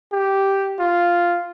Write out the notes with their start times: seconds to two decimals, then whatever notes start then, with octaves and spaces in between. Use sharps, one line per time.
0.12 G4
0.79 F4